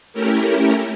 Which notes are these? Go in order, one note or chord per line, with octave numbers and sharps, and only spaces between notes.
A3 C#4 E4 G4 A#4